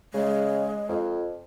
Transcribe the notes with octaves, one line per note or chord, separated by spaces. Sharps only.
C#3 G#3
F2